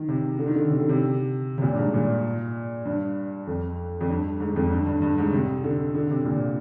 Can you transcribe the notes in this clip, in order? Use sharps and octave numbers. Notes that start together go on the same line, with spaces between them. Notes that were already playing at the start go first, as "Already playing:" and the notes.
Already playing: D#3
C3
D3
D#3
D3
C3
D3
C3
C3
A#2
G2
G#2
A#2
G2
F2
F2
G2
G#2
F2
G2
G2
G2
G#2
C3
D3
D3
C3
A#2